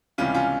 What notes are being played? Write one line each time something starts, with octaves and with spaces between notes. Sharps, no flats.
C#2 C3 E3 G3 C#4 F4
C#4 F4